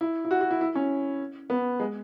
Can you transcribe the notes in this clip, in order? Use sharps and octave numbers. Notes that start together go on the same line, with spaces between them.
E4
E4
F#4
F#4
E4
E4
C#4
B3
G#3